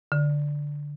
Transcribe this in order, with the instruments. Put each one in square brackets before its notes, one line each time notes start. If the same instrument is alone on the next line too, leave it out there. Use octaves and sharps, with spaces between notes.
[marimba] D3